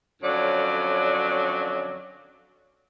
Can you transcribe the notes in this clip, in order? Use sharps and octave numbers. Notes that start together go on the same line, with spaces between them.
F2 D3 F#3 C#4 D5